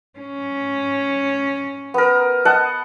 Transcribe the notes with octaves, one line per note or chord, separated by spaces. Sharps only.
C#4
B3 A#4
D#5 F#5 A5